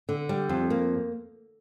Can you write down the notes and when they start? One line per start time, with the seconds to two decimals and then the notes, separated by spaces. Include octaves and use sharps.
0.09 D3
0.29 G3
0.49 F2
0.70 A#3